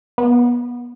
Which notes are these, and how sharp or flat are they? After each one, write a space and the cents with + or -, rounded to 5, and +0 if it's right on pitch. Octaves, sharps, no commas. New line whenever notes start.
B3 -25